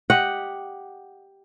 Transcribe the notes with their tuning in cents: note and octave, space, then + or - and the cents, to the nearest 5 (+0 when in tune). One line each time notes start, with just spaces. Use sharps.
G4 +0 D#5 +0 F#5 +0